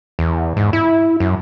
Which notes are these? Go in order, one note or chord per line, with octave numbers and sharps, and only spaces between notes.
E2
G#2
E4
F#2